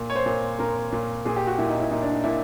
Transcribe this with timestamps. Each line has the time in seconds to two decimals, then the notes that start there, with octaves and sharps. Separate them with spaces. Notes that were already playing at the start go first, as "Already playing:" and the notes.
Already playing: A#2
0.10 C#5
0.16 C5
0.26 A#2
0.59 A#2 A#4
0.92 A#2
1.25 A#2 G#4
1.36 G4
1.47 F#4
1.58 A#2 E4
1.69 D#4
1.80 E4
1.91 A#2 D#4
2.02 D4
2.13 D#4
2.24 A#2 E4